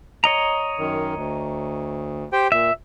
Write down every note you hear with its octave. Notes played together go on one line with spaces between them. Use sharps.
C#5 D#5 A#5
F#2 D#3
D2
G4 C5 G5
A#2 E5